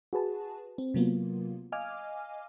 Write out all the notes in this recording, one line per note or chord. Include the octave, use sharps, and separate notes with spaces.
F#4 G#4 B4 A5
C4
C3 F#3 A#3 B3 F4
D#5 F5 G#5 D6 F6